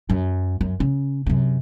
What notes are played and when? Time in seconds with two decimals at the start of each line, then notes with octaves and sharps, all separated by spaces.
0.10 F#2
0.61 F#2
0.80 C#3
1.26 F#2 C3